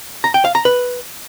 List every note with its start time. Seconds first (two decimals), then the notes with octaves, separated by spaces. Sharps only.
0.24 A#5
0.34 G5
0.45 F5
0.55 A#5
0.65 B4